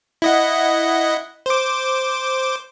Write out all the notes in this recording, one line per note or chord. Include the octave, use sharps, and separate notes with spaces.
E4 D#5 F#5
C5 D6